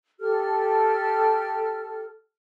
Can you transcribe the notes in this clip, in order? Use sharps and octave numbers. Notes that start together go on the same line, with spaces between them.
G4 A4 F6